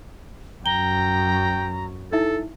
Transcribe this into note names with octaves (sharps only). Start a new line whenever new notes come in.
F#2 G5 A#5 G7
D#4 E4 A4 E5